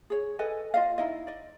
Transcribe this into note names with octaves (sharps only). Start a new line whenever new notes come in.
G#4 C#5
A4 B4 D#5 G#5
F4 D#5 F5
D#4 E4 D#5
D5 D#5